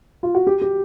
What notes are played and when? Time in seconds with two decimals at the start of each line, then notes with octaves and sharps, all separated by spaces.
0.23 F4
0.35 F#4
0.47 G4
0.62 G4